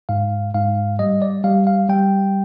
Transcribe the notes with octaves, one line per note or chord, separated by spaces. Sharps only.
G#2 F5
G#2 F5
G3 D#5
D5
G3 F5
F5
G3 G5